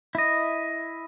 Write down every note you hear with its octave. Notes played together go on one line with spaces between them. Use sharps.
E4 D#5